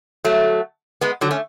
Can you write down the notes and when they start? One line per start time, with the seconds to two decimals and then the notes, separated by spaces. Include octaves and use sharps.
0.25 F#3 A3
1.01 G#3 B3
1.21 D3 F#3
1.31 A3 C#4